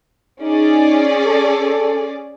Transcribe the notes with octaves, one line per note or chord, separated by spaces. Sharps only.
C#4 D#4 G#4 D5
A4